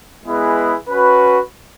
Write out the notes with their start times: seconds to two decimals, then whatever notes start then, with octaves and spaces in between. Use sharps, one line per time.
0.24 G#3 B3 E4 G#4 B4
0.88 C#4 F#4 B4